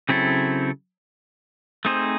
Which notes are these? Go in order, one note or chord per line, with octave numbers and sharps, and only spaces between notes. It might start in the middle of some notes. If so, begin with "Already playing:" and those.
C#3 F#3 C4 E4 A4
A3 C4 D#4 G#4 C5